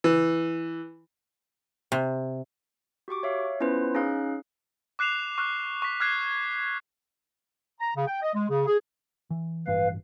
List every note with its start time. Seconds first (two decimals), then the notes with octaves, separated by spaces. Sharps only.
0.04 E3
1.92 C3
3.08 F#4 G4 C#6 D6
3.23 C#5 E5 F5
3.60 B3 C#4 E4 F4 B4 C5
3.95 C#4 D#4 G#4 F5 F#6
4.99 D6 F#6 C7 E7 F7
5.38 C#6 F6 F#6
5.82 C#6 B6
6.00 D6 F6 F#6 G#6 C7
7.80 A#5
7.96 C#3
8.07 G5
8.22 D#5
8.35 G#3
8.49 C#3
8.66 G#4
9.30 E3
9.67 A1 G2 E3 B4 F5